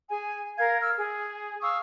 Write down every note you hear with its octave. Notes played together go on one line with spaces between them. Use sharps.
G#4 G#5
A#4 F5 G#6
E6 F6
G#4
F5 C#6 D#6 E6